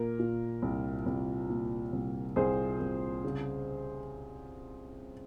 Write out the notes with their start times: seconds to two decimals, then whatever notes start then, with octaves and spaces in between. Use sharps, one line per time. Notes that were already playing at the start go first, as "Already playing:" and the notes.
Already playing: A#2 A#4
0.19 A#2
0.62 C2
1.06 C2
1.49 A#2
1.93 C2
2.36 C2 G#4 C5
2.80 C2
3.24 C#3